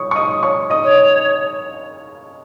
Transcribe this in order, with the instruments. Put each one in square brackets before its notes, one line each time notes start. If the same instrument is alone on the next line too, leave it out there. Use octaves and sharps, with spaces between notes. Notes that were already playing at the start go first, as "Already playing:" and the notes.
Already playing: [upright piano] C#5 C#6 D#6
C#6
D#5 D#6
C#5 C#6
D#5 D#6
[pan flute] C#5